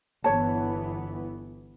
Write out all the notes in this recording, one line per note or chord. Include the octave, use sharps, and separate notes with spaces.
G1 E3 B3 C#5 A5